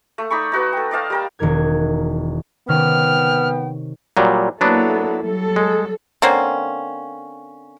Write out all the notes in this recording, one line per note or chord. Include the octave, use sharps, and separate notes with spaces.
A3
D#4 D5 B5 C#6
D#4 F#4 B4
A4 G5
D5 D#5 F5 A5
G3 A#4 G5
E1 D#3 E3 A#4 G#6
C3 D#3 B3 C#4 G5 F6
A#2 F#3 G3
F#3 A#3 B3 D4 E4 A4
F#3 G3 A4
G#3
D3 A#3 C4 C#4